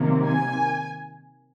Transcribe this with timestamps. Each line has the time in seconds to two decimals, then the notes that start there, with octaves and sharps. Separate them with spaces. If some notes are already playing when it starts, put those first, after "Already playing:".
Already playing: C3 D#3 F#3 A#3
0.26 G#5